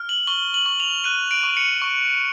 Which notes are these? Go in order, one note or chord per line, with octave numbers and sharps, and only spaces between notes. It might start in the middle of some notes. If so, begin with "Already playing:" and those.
Already playing: F6
F#7
C#6 G7
F#7
C#6
F7
F#6 D#7
D7
C#6
C#7
C#6